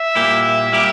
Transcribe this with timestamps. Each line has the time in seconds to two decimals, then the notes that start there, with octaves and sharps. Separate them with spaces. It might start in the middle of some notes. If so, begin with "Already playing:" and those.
Already playing: E5
0.15 A#2 G3 A#3 E4 G4
0.72 A#2 G3 A#3 E4 G4